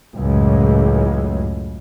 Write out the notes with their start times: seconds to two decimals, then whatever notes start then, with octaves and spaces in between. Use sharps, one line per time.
0.16 C#2 F#2 A2 G#3